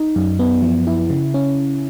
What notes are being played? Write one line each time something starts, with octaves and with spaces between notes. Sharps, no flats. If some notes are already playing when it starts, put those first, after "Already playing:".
Already playing: D#4
F#2
B3
F3
E4
C#3
C#4